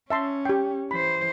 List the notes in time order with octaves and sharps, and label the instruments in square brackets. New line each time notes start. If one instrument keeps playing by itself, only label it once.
[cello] C#4 [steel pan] E5 A5 C6
[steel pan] G4 G5
[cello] E3 C5 [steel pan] B5